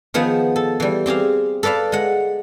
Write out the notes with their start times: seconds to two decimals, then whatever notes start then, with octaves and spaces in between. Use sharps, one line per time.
0.14 D#3 F3 B3 G#4 F#5
0.56 A4
0.80 E3 G3
1.06 C4 G4 G#4 F5
1.63 A4 B4 D5 F5 A5
1.92 G#3 F#5